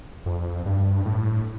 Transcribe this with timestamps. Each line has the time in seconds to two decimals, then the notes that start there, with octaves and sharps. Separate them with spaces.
0.26 F2
0.66 G2
1.05 A2